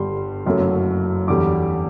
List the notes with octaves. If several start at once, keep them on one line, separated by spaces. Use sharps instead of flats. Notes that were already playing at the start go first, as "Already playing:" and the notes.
Already playing: G1 G2 D3 G3 C6
F#1 F#2 F#3 A3
E2 D3 G3 D6